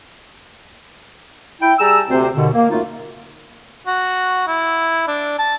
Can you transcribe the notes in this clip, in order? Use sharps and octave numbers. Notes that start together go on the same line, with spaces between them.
E4 G5
G3 G#4 A5 A#5 E6
D2 C3 C4 C5
D#2 B2 D3
A#3
F#2 A3 D#4 F4
F#4
E4
D4
A5